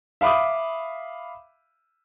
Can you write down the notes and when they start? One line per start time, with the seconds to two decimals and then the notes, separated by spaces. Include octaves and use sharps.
0.21 E5 F5 B5 D6 D#6